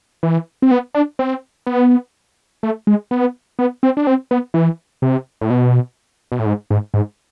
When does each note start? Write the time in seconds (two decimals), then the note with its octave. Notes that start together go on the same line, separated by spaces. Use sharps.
0.23 E3
0.62 C4
0.71 B3
0.95 D4
1.19 C4
1.67 B3
2.63 A3
2.87 G#3
3.11 B3
3.59 B3
3.83 C4
3.97 D4
4.07 C4
4.31 B3
4.54 E3
5.02 C3
5.41 A2
5.50 B2
6.32 B2
6.39 A2
6.46 G#2
6.71 G#2
6.94 G#2